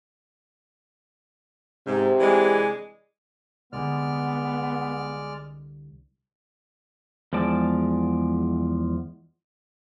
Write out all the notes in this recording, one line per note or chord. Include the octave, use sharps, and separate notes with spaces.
G#2 C3
E3 G#3 D4
C2 D3 G#3 B3 D5 F6
E2 F3 G#3 D5 A5